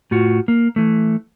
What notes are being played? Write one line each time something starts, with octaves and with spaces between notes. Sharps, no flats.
A2 F4 F#4
A#3
E3 A3